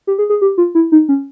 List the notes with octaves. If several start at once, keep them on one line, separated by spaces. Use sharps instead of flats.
G4
G#4
G#4
G4
F4
E4
D#4
C#4